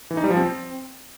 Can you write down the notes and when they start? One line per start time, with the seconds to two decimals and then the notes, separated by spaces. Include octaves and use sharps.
0.11 E3
0.17 D#4
0.24 G3
0.30 F3
0.37 C4